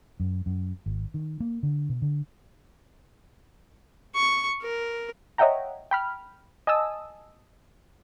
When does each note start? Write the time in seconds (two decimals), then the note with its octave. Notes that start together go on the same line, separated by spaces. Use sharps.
0.20 F#2
0.46 F#2
0.86 G#1
1.14 D#3
1.40 A#3
1.63 D3
1.89 B2
2.02 D3
4.15 C#6
4.62 A#4
5.38 C#5 D#5 E5 F#5 G5 A#5
5.91 G5 B5 F6
6.67 D#5 G#5 A5 D#6 E6